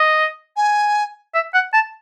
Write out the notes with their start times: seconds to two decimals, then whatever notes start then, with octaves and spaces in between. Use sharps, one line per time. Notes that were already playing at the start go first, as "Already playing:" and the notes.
Already playing: D#5
0.56 G#5
1.35 E5
1.54 F#5
1.73 A5